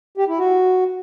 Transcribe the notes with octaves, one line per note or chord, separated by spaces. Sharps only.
G4
E4
F#4